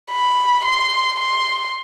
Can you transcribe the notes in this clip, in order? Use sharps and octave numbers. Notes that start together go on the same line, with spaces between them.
B5
C6
C6